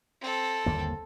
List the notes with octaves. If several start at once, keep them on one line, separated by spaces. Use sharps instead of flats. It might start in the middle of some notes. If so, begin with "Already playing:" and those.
C4 A4
G1 D#2 A#3